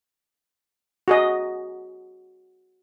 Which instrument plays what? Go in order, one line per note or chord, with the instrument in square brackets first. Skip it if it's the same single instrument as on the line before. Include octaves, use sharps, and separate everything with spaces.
[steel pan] F#4 G#4 D#5